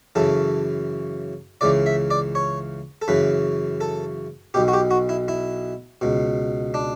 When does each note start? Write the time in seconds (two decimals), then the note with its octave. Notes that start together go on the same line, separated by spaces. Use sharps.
0.15 F#2 C#3 E3 A4
1.61 C#2 C#3 E3 D5
1.86 E5
2.11 D5
2.35 C#5
3.02 A4
3.08 F#2 C#3 E3 B4
3.81 A4
4.54 B1 B2 G4
4.68 F#4
4.73 G4
4.91 F#4
5.09 E4
5.28 E4
6.01 C#2 B2
6.74 D4